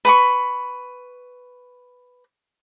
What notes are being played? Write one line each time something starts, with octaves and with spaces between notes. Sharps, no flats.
B4 B5 C#6